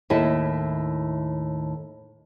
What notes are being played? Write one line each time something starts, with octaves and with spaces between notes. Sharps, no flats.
D#2 A2 E4 A4